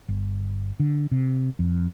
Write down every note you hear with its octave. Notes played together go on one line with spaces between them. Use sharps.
G1
D3
C3
F2